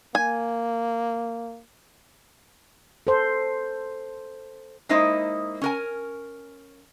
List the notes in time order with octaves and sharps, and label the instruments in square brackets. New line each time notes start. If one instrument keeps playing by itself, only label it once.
[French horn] A#3 [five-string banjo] G#5
[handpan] A4 C5
[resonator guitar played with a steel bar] G#3 A#3 D#4 E4 C5 D#5
C#4 A#4 G#5